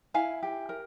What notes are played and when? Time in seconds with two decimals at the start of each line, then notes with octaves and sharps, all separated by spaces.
0.14 E4 F5 G#5
0.43 G4
0.69 A#4